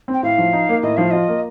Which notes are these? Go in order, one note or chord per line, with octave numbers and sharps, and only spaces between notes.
C4
G5
A2 F5
F3
D#4
A#3
A2 D#5
F3 F5
F4 D#5
A#3